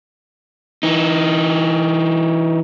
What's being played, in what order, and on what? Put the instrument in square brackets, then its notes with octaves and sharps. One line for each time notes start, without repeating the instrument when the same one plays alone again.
[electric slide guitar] E3 D#4